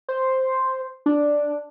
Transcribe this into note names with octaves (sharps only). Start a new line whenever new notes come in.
C5
D4